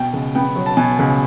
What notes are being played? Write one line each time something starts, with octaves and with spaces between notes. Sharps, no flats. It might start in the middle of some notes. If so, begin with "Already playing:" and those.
Already playing: B2 G5
C#2
B3 G5
F#3
A5
B2 G#5
C#2